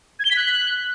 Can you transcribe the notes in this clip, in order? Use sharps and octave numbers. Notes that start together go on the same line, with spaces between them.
G#6
G7
B6
F#6